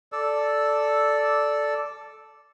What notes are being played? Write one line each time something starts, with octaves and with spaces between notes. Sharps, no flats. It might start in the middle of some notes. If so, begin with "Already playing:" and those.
A4 D5 E6